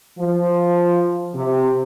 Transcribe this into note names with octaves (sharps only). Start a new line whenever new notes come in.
F3
C3